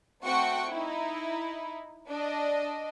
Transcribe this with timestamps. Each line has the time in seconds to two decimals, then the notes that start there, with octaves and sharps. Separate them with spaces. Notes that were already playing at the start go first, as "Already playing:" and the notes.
0.24 A3 C4 F#4 F#5 G5 C#6
0.70 D#4 E4
2.09 D4 D#5